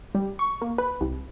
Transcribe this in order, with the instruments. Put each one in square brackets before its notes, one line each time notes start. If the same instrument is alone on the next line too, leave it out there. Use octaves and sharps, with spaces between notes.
[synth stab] G3
C#6
A#3
B4
C2